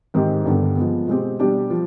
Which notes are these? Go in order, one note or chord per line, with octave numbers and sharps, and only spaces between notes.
G#2 D#3 G#3 C4 G4
G2 D3 G3 B3
F3 G#3 B3
B2 G#3 C4 G4
B2 G3 D4 G4
F3